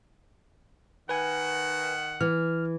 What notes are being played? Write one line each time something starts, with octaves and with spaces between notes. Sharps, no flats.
D#3 B4 F#5 G#5
E3 F6